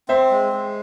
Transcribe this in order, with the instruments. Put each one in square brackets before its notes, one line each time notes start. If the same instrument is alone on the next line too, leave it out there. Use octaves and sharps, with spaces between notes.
[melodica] C4 [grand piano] C5 E5
[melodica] G#3
G#3